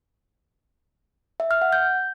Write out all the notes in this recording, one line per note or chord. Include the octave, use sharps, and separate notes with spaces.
E5
F6
F#5
G6